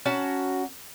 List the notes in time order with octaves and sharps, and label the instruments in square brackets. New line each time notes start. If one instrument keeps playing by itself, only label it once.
[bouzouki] C#4 F#4 A5 A#5